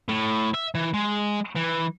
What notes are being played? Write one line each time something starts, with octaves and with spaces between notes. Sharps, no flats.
A2
E5
E3
G#3
E3